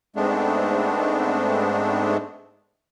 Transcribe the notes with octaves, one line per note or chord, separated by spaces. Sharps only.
G#2 G#3 A3 B3 C4 D4